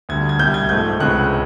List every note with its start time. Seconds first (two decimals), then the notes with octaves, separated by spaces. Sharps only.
0.09 D2 D3 G3 G#6
0.29 G#6
0.39 C2 B2 G3 G6
0.54 G#6
0.69 G#2 F3 A3 G6
1.00 C#2 C3 E3 G#3 C#4 F#6